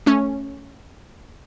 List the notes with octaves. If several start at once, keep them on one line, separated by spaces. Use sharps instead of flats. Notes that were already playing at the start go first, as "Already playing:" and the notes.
A3 C#4